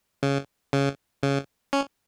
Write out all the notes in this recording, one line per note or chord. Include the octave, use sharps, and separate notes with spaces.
C#3
C#3
C#3
C#4